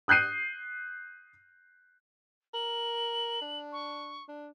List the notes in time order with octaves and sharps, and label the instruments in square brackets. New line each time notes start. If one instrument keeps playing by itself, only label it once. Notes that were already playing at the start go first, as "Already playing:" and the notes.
[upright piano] D#6 F#6 G6 C7 D#7
[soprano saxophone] A#4 [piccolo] F#7
[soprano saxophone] D4
[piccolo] C#6
[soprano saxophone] D4